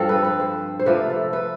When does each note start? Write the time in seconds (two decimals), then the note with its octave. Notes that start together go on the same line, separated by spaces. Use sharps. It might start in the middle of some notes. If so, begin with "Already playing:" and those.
Already playing: G2 F3 C4 A4
0.09 B4
0.24 B4
0.40 C5
0.79 C5
0.86 C3 F3 A3 B4
1.10 A4
1.33 B4